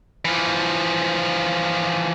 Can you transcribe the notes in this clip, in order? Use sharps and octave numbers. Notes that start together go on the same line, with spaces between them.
E3 F3